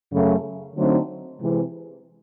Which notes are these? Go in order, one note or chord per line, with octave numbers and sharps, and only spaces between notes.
F#2 C#3 F#3 A3
D3 F#3 A3 C4 D#4
C3 E3 G#3 C4